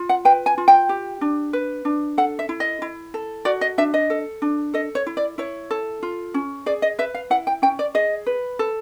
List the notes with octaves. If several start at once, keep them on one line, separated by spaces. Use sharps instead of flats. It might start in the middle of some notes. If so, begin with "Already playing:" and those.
Already playing: F4
F#5
B4 G5
G#5
F4
G5
G4
D4
B4
D4
A4 F#5
E5
E4
D#5
E4
A4
F#4 D5
D#5
D4 E5
D#5
A4
D4
A4 D#5
C#5
E4
D5
E4 C#5
A4
F4
C#4
G#4 D5
D#5
B4 E5
F5
E4 F#5
G5
C#4 G5
D5
G#4 D#5
B4
A4